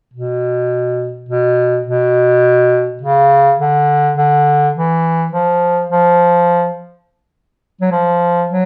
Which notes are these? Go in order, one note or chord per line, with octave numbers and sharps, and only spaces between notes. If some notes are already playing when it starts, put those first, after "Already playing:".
B2
B2
B2
C#3
D3
D3
E3
F3
F3
F#3
F3
F#3